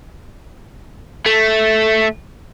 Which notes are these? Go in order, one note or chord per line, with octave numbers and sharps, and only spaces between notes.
A3